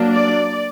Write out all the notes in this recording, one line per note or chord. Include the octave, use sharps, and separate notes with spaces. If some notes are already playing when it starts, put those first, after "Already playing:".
Already playing: F#3 A#3 D4
D5